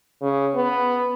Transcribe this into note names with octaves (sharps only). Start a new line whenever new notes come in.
C#3
B3